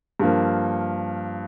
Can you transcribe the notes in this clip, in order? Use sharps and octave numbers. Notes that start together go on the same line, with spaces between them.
G2 F3 A#3